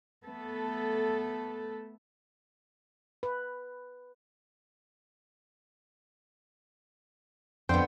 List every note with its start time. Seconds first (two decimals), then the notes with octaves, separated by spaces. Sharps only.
0.25 A3 B3 A4
3.23 B4
7.69 F2 D3 B3 C5 G5